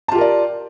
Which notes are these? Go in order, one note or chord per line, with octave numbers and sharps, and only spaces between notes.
F4 G4 A#4 D5 A5